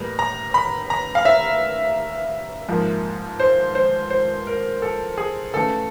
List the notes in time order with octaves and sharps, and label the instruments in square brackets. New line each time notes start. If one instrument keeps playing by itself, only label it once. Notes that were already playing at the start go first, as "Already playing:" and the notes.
Already playing: [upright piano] A2 E3 G3 A#3 A#5
A#5
B5
A#5
F5
E5
G#2 F3 A#3
C5
C5
C5
A#4
A4
G#4
C#3 E3 A3 A4